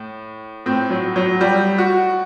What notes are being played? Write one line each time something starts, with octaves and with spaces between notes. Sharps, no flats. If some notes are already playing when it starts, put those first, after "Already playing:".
Already playing: A2
A2 C4
F#3
F#3
G3
F#4